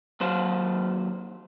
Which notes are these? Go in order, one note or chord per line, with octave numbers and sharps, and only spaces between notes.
D#2 F#3 C5